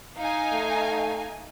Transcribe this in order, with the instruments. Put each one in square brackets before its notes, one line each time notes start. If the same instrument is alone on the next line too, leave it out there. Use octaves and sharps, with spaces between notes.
[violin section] D#4 F5 G#5
[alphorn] A3